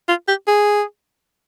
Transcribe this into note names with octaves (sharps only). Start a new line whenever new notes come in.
F4
G4
G#4